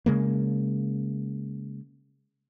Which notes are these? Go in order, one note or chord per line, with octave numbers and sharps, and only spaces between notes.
C#3 G#3 A#3